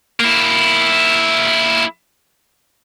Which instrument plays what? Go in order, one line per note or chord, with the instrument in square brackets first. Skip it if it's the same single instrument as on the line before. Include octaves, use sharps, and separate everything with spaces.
[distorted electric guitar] A#3 E4